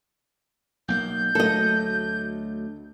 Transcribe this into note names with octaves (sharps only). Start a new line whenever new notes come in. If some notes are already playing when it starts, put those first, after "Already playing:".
B1 A#3 G6
D2 F#3 A3 A4 D#5